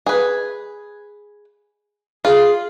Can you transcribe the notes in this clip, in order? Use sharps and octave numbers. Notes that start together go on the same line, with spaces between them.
G#4 B4
F4 G#4